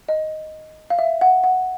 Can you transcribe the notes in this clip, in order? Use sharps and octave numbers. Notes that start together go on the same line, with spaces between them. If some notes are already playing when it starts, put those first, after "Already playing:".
D#5
F5
E5
F#5
F#5